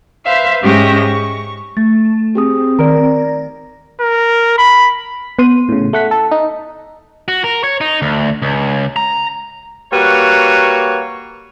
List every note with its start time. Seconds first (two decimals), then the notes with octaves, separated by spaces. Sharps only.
0.25 B4 C5 E5 F5
0.62 G#2 G#3 C#4 G4 E5 A#6
1.05 C#6
1.77 A3 A6
2.35 C4 G4 G#4 D#6
2.79 D#3 A#4 D5 A#5
4.00 A#4
4.58 B5
5.39 B3 C6 D#7
5.69 A2 C#3
5.93 A3 F#5 B6
6.11 A4
6.31 D#4
7.28 F#4
7.44 A#4
7.64 C#5
7.81 D#4
8.02 D2
8.42 C#2
8.96 A#5
9.92 G3 A#3 F#4 B4 C#5